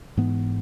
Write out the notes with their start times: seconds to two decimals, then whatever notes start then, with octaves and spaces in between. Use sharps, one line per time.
0.17 G#2 E3 B3